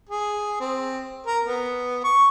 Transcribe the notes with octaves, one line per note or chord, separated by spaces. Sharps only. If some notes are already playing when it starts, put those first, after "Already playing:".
G#4
C4
A#4
B3
C#6